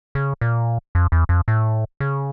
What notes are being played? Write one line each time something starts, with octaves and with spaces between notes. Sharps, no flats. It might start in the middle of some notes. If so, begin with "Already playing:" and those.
C#3
A#2
F2
E2
F2
A2
C#3